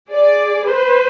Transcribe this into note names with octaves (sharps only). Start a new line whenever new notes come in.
G#4 D5
B4 C5